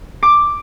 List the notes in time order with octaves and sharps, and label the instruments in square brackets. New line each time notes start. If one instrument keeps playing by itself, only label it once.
[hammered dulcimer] D6